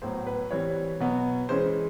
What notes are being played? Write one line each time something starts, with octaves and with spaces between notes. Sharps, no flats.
A2 F#3 B3 C5
B4
E3 G3 C4 C#5
B2 F#3 B3
E3 G#3 C#4 C5